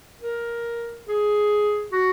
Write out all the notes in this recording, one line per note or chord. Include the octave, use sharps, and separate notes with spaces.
A#4
G#4
F#4